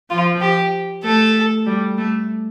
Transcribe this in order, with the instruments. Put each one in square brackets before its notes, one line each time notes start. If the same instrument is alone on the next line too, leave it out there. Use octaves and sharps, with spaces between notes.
[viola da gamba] F3 [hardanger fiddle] F4
[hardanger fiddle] G4
[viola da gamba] A3 [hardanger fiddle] A4
[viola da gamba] G3
A3